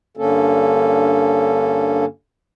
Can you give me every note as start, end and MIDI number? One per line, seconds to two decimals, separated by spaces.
0.17 2.05 43
0.17 2.05 50
0.17 2.05 58
0.17 2.05 61
0.17 2.05 69